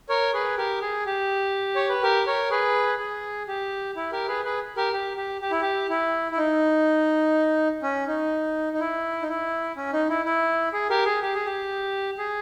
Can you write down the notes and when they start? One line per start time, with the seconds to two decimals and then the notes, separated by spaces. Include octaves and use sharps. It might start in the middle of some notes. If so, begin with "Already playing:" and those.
0.09 A#4 C#5
0.34 G#4 B4
0.57 G4 A#4
0.82 G#4
1.06 G4
1.75 C#5
1.89 B4
2.02 G4 A#4
2.27 A#4 C#5
2.51 G#4 B4
2.99 G#4
3.48 G4
3.96 E4
4.12 G4 A#4
4.28 G#4 B4
4.44 G#4 B4
4.77 G4 A#4
4.93 G4
5.17 G4
5.42 G4
5.51 E4
5.61 G4
5.89 E4
6.32 E4
6.38 D#4
7.83 C#4
8.07 D#4
8.73 D#4
8.80 E4
9.22 D#4
9.29 E4
9.76 C#4
9.93 D#4
10.09 E4
10.25 E4
10.73 G#4
10.90 G4 A#4
11.05 G#4
11.22 G4
11.34 G#4
11.46 G4
12.18 G#4